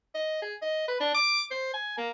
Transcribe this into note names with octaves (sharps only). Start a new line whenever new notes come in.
D#5
G#4
D#5
B4
D4
D6
C5
G#5
A#3